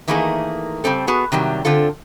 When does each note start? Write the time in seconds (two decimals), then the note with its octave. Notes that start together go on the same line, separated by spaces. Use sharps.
0.08 D#3 E3 A3 A#3 D#4 G#4
0.84 C#3 G3 C4 A4
1.07 B3 F#4 G#4
1.32 C3 D#3 F#3 G3
1.65 D3 C4 F4 A4